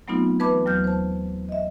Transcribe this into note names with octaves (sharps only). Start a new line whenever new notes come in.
F#3 A3 B3 C4 D#4 F4
E3 B4 A5 B5 D6
D#2 F#3 F6 G6
C5 A5
D#5 E5